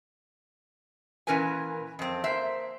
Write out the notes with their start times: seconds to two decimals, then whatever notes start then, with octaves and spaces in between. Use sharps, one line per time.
1.27 A#2 E3 C#4 A#4 B4 G#5
1.99 F2 C4
2.24 A#3 C5 E5